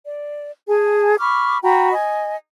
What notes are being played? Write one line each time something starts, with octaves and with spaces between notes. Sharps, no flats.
D5
G#4 G#5 A5
B5 C#6 D6 F6
F#4 G5 A#5 B5
D#5 G#5